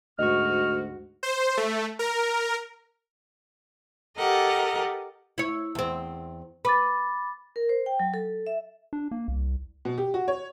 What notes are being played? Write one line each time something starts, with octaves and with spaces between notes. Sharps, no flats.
D2 G#2 F#4 D#5 C#6 F6
C5
A3
A#4
G4 A4 A#4 D#5 F#5
E4 C#5
E2 C4
B4 B5 D6 A6
A#4
C5
G5
F#3
A4
E5
D4
A#3
C2
B2
G4
F#4
C#5